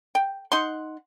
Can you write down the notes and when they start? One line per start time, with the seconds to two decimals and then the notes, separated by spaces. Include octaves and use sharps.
0.15 G5
0.52 D#4 F#5 C6